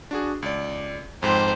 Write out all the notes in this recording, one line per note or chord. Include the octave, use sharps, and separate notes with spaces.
D4 F#4 G#4
C#2 D5
F2 G#2 C5 G5